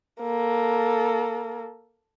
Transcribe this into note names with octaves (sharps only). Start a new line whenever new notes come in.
A#3 A4